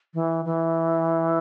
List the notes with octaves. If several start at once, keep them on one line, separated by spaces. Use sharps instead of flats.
E3
E3